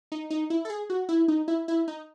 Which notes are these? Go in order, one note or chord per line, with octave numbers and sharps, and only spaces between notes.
D#4
D#4
E4
A4
G#4
F#4
E4
D#4
E4
E4
D#4